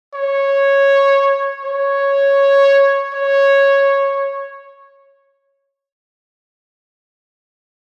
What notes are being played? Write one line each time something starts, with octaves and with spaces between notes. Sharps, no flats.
C#5
C#5
C#5